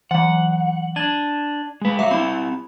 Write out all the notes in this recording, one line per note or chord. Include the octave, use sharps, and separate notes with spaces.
E3 F#3 F#5
D4 G#6 D#7
G#3 B4
F#3 E5 F5 D6
C4 E4 B5